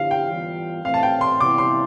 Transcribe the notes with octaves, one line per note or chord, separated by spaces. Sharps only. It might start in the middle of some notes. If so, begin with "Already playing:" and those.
Already playing: D3 F3 B3 E4 G4 F5
G5
E3 G3 B3 F4
A2 E3 A3 C4 F5
A5
G5
C6
C3 E3 G3 B3 E4 D6
C6